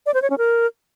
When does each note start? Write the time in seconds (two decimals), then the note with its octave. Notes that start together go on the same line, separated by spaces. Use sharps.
0.06 D5
0.14 C5
0.22 C#5
0.30 C#4
0.38 A#4